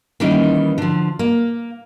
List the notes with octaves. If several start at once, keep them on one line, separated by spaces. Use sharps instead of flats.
D#3 E3 G3 A#3 C#4 D#4
D3 F3
A#3